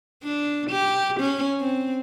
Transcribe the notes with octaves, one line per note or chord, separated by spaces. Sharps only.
D4
G4
C#4
C4